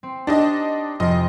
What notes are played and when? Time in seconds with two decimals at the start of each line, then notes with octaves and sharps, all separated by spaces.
0.03 C4
0.27 D4 D#4 G4 D#5 A5
1.00 F1 F2 D#5 C6